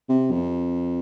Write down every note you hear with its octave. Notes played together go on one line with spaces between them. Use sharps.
C3
F2